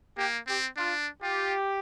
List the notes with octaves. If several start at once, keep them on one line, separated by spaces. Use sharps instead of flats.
A#3 G4
C4 G4
D4 F4
F4 G4